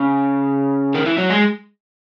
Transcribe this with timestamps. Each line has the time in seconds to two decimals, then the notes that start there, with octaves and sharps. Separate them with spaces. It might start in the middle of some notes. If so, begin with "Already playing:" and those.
Already playing: C#3
0.95 D#3
1.06 E3
1.18 F#3
1.30 G#3